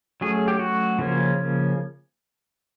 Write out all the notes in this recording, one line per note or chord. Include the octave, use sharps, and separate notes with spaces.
F#3 A3 C#4 G#4
G4
F#4
C#3 F3 A#3 C#4